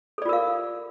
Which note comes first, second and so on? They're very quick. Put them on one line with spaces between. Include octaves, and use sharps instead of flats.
A4 D5 F4 A#4 F5